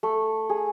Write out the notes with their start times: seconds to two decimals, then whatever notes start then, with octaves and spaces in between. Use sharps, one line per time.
0.03 A3
0.49 G#4